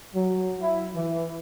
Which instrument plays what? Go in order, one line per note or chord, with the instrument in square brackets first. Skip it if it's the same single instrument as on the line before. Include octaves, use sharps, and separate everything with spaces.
[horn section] F#3
E4
E3